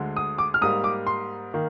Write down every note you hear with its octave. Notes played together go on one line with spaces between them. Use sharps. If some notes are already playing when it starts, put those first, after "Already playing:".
Already playing: D2 D3 G#3
D#6
D6
F6
G#2 G3 A#3 D#6
D6
C6
D#3 A#3